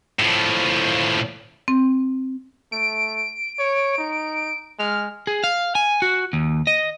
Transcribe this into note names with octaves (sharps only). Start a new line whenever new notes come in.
A2 F3
C4
A3 D7
C#5
D#4
G#3 F6
G#4
F5
G#5
F#4
D#2
D#5